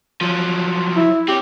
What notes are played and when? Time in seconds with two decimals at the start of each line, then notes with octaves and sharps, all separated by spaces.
0.21 F3 F#3
0.96 E4
1.28 C4 G4 C#5